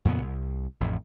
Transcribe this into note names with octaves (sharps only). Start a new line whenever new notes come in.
F2 A#2 C#3 B3
C2
A1 F2 A2